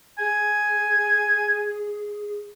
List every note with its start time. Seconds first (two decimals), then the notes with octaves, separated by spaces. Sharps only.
0.18 G#4 G#5